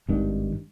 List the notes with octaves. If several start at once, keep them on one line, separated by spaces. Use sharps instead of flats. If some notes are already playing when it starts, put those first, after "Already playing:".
G#1 G2 D#3